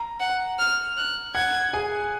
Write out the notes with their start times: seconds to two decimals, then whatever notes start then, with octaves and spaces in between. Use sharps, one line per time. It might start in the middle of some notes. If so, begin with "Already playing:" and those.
Already playing: A#5
0.20 F#5
0.59 F6
0.97 F#6
1.34 F#5 F#6 G#6
1.73 G#4 G#5